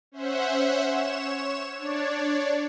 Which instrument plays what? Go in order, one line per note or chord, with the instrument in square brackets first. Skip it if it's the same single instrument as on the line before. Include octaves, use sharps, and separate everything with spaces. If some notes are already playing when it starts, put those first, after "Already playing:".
[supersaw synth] C#4 C5 E5 F#5
C#5 E7
D4 C#5 D5